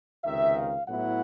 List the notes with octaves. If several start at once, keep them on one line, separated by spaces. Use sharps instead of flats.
C#2 C3 D#3 E5
F5
A2 F#3 B3 E4 F#5